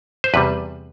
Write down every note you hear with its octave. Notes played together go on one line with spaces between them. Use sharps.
C5
E2 C3 G3 B4